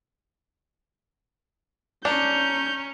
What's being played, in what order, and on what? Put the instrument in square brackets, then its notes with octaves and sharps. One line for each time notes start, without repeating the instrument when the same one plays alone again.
[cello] C#4 [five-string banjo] D4 [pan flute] A#5 [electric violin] G6